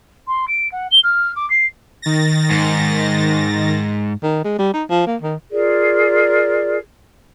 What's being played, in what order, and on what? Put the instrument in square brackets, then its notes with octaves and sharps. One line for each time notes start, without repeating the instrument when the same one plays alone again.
[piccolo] C6
D7
F#5
G7
F6
D6
C7
[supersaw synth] D#3 A6 A#6
[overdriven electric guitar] G#2
[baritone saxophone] D#3
G#3
G3
D#4
F3
A#3
D#3
[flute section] F4 G#4 A#4 D5